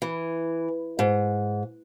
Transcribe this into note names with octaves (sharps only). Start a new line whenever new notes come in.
E3
G#2